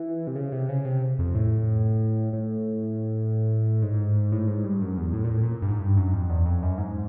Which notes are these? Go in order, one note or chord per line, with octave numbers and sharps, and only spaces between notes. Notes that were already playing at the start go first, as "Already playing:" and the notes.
Already playing: E3
C3
C#3
C3
C#3
C3
F2
A2
A2
G#2
A2
G#2
G2
F#2
E2
A2
A#2
A2
A#2
G2
G#2
G2
F#2
F2
E2
F2
F#2
G#2